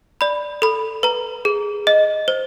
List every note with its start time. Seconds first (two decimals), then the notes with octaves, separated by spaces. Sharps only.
0.21 D5 B5
0.62 A4 B5
1.03 B4 A#5
1.45 G#4
1.87 D#5
2.28 C5